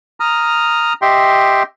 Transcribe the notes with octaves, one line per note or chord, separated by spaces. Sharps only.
A#5 D#6 F6
G4 D#5 E5 G5 C6